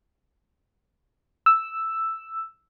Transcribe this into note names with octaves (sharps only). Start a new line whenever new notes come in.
E6